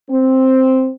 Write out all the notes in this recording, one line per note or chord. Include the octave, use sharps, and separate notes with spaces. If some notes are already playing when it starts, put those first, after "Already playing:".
C4